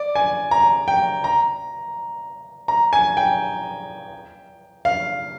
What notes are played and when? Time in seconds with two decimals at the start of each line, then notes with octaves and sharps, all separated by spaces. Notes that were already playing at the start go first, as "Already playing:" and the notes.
Already playing: D5
0.15 G#5
0.51 A#5
0.88 G5
1.24 A#5
2.68 A#5
2.93 G#5
3.17 G5
4.85 F5